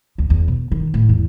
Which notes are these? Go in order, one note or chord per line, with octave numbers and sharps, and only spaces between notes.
D2
E2
B2
D#3
A2
E2